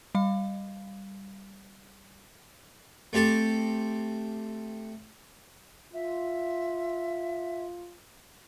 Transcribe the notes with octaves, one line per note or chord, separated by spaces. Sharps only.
G3 F5
A3 C4 G4 A4
F4 E5